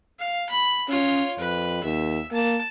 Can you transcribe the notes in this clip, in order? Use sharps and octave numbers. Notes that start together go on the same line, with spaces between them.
F5
B5
C#4 F4 C#5
F2 B4
D#2 E5
A#3 A5